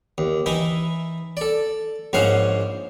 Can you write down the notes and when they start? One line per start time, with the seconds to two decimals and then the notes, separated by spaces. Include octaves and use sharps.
0.18 D#2
0.46 E3 D#4 E4
1.37 A4 D5
2.13 A#1 G#2 C#4 C5 F5 F#5